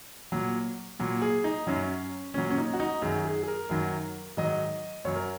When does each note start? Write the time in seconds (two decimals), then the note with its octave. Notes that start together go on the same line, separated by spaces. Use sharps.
0.32 A#2 F#3
0.99 A#2 F#3
1.22 G#4
1.44 D#4
1.67 F#2 F#3 C#4
2.34 A#2 F#3 C#4
2.50 C#4
2.58 D#4
2.73 F#4
2.80 D#4
3.02 F#2 D#3 F#3 G#4
3.25 G#4
3.43 G#4
3.48 A#4
3.70 F#2 D#3 F#3
4.37 G#2 D#3 F#3 D#5
5.05 F#2 F#3 C#5
5.16 A#4